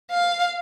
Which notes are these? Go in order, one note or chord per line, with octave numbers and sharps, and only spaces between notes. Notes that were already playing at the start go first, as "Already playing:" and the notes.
F5